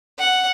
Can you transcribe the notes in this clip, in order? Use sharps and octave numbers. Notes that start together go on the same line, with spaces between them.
F#5